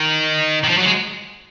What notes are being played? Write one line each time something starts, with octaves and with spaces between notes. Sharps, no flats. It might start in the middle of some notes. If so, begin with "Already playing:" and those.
Already playing: D#3
D#3
F3
F#3
G#3